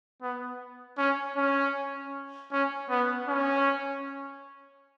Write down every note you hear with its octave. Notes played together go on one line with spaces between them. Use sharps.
B3
C#4
C#4
C#4
B3
C#4